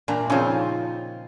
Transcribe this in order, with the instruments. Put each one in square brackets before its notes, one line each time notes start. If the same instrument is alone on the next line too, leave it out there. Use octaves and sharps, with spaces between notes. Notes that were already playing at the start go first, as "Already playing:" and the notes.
[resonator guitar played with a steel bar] E2 D4 A#5 [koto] A#2
[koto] C#3 F3 [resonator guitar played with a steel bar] C4 D#4 F4